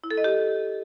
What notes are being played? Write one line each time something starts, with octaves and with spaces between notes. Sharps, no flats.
E4
A4
D#5
G4